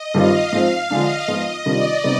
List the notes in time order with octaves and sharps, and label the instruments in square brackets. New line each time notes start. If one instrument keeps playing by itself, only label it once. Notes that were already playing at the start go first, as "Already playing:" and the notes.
Already playing: [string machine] D#5
[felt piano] G2 D#3 G3 C4 F4 [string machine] F5
[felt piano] G#2 F3 C4
[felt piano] D3 F3 G#3 D4 [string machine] D#5
[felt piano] G#2 F3 B3 F4 [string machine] D#5
[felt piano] C3 D#3 G3 D4 F4 [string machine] D5
[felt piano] C3 G3 B3 D#4